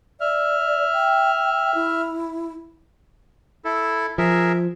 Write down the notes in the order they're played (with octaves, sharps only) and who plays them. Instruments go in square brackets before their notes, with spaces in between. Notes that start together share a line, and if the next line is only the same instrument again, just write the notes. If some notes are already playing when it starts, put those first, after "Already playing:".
[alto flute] D5 [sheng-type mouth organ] E5 F6
[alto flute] G5
E4
[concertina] E4 A4
[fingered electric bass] F3 [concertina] G#4 A#4 E5